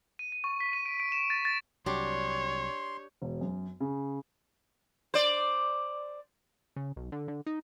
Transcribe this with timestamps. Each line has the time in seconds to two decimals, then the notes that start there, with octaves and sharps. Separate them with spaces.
0.19 D#7
0.32 D#7
0.44 C#6
0.60 B6
0.73 D#7
0.86 D7
1.00 D7
1.12 E7
1.30 A6
1.45 A6
1.86 C2 F#3 D4 G4 C#5 C6
3.22 E1
3.41 F#2
3.80 C#3
5.14 C5 D5
6.76 C#3
6.96 B1
7.12 D3
7.28 D3
7.46 D#4